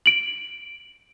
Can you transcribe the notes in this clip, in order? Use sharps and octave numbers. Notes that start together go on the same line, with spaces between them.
D7 F#7